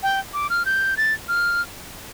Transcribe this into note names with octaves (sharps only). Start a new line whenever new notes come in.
G5
D6
F6
G6
A6
F6